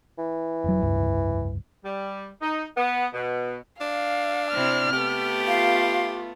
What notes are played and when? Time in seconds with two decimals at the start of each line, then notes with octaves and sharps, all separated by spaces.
0.18 E3
0.64 F1 F#3
0.82 F1 C#2 G2
1.85 G3
2.41 D#4
2.77 B3
3.13 B2
3.81 D4 F5
4.52 C3 C4 E4 F6
4.93 A3 B3 G4
5.47 F4 F5